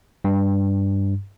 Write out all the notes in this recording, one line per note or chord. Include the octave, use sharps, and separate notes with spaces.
G2